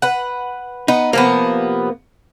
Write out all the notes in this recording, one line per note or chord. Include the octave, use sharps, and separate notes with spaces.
B4 F#5
B3 D#4
C3 F3 A#3 B3